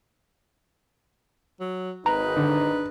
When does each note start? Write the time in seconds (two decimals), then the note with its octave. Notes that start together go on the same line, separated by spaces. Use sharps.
1.60 F#3
2.06 G#1 D#4 B4 A#5
2.36 D3